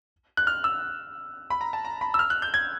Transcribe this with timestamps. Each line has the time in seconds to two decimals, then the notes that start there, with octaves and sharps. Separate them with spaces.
0.37 F#6
0.47 F6
0.64 E6
1.50 B5
1.61 A#5
1.73 A5
1.85 A#5
2.01 B5
2.14 E6
2.19 F6
2.30 F#6
2.42 G6
2.54 G#6